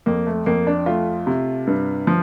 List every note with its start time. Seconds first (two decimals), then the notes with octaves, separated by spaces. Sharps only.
0.06 F2 A#3
0.27 A3
0.46 F2 A#3
0.67 D4
0.86 A3 F4
1.27 C3
1.67 G2
2.07 F3